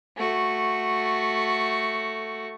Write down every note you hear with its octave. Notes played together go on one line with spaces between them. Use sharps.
A3 F#4